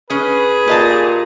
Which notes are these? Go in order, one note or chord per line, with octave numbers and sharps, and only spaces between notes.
C#4 G#4 B4
A#2 G4 D#5 A5